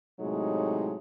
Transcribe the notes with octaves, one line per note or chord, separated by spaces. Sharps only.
A2 C3 F#3 G#3 D#4